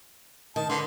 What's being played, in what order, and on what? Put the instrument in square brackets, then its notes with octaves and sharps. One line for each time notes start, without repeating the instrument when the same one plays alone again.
[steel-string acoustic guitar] D#3 [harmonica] A5
[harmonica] D3 C6 [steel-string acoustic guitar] B4